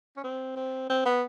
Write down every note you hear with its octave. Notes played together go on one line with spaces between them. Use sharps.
C#4
C4
C4
C4
B3